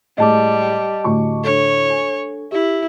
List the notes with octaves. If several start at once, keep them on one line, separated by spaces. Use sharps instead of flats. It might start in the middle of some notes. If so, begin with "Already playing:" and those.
A2 G3 G#3 D#5 A5 D6
D2 A2 C#6
D4 A4 C#5
G#5
E4 G4